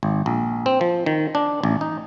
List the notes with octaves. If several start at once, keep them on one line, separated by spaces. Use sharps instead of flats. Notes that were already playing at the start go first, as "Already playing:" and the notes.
G#1
A#1
C4
F3
D#3
D4
A1
D#4